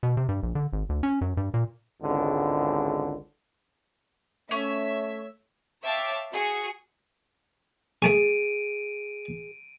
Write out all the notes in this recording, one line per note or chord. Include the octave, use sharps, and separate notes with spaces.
B2
C3
G2
A#1
D3
G#1
D2
C#4
F#2
G2
A#2
G#1 C#2 D3
A3 C#4 C#5 E5
C#5 E5 F5 G5 A5 D6
F#4 G#4 C#7
A3 G#4 A5 C#6 D7 D#7